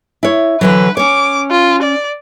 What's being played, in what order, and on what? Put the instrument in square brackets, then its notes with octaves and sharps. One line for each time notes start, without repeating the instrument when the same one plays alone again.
[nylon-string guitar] E4 C#5
[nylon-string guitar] D3 E3 F#3 [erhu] B4
[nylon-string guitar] C#4 C#5 [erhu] D6
[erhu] F4
D5